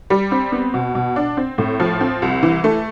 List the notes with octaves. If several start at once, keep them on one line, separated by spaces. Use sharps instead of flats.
G3
C4
B3
B2
B2
D4
C4
A2
F3
C4
C2
E3
A3